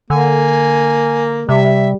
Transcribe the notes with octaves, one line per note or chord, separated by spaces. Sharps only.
D3 A#3 G#5
C3 G3 E5